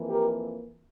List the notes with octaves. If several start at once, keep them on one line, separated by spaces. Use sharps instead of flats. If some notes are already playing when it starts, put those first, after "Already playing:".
Already playing: F2 E3 A#3
G4 A#4